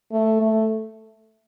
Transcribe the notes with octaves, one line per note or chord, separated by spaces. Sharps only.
A3
A3